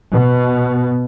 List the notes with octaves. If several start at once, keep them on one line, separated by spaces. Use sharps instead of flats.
B2